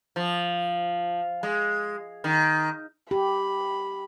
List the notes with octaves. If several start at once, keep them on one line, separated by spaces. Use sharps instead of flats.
F3
G#3
D#3
G4 B5